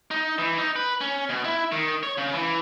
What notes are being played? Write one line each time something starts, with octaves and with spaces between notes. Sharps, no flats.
D#4
E3
D#4
B4
C#4
B2
E4
D#3
C#5
C#3
E3